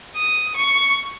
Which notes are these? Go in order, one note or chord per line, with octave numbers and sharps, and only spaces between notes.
D#6
C#6